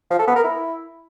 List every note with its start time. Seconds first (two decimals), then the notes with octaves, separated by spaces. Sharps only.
0.11 F3
0.19 A4
0.27 B3
0.36 A#4
0.44 E4